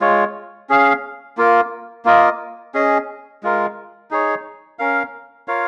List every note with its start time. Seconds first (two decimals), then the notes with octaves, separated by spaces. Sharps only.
0.01 G#3 F4 C#5
0.69 C#4 G#4 F5
1.37 A#3 F4 A#4
2.05 A#3 F4 A#4 D#5
2.74 C#4 G#4 D#5
3.43 G#3 F4 A#4
4.11 D#4 G#4 C#5
4.79 C#4 A#4 F5
5.48 F4 A#4 C#5 F5